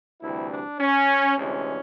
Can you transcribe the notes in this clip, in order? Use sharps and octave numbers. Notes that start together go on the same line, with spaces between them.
D2 C3 E3 G3 E4
D4
C#4
D2 C3 E3 G#3 C#4